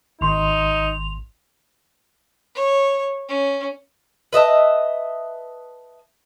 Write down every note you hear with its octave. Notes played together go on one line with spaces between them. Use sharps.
G#1 D#4 C6 F7
C#5
C#4
B4 D#5 E5 A5